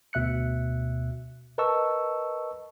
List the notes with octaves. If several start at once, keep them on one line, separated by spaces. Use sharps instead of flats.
D2 B2 E5 F#6 C#7
A#4 B4 D#5 A5 C#6 E6